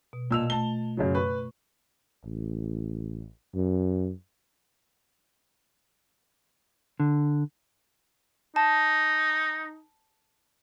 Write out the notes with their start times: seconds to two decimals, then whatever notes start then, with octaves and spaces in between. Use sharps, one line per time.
0.13 B2
0.31 A#2 F4 D#5 A5 E6 F7
0.50 A3 A5 G7
0.97 F#2 C#3 F#3
1.15 B4 C#6
2.25 A1
3.55 F#2
7.00 D3
8.56 D#4 A5